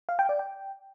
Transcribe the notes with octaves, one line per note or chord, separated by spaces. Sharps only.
F5
G5
D5
G5